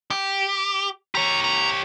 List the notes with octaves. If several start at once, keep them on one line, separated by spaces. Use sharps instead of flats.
G4
G4 C#5 A#5
A#5